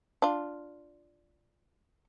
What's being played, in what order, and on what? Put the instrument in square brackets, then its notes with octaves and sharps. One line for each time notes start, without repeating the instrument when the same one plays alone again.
[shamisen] D4 F4